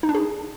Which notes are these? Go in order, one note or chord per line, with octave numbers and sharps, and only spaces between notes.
D#4
D4
G#4